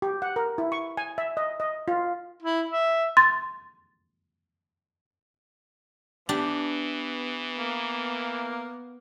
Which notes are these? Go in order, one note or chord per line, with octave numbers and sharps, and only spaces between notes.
G4
F#5
A#4
E4
C#6
G#5
E5
D#5
D#5
F4
E4
E5
C6 A6
E3 B3 D4 G4
A#3